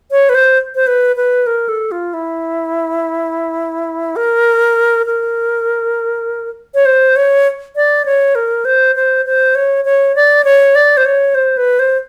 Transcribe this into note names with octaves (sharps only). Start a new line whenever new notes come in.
C#5
B4
C5
C5
B4
B4
A#4
A4
F4
E4
A#4
A#4
C#5
C5
C#5
D5
C#5
A#4
C5
C5
C5
C#5
C#5
D5
C#5
D5
C5
C#5
C5
B4
C5